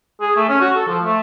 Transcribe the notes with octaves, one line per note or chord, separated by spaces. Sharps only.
G#4
A3
C#4
F#4
A4
F3
A3